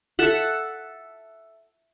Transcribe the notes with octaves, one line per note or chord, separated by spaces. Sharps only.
A4 E5 F#5